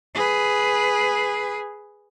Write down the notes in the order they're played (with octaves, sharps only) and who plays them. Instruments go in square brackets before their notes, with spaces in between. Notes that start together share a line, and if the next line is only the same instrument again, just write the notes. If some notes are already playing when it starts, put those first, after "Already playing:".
[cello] G#4 B4